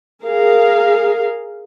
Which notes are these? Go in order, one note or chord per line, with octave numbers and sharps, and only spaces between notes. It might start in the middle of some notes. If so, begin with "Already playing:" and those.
G#4 A#4 F5